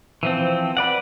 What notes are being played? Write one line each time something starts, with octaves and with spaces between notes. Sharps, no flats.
E3 F3 C4
B4 D5 F#5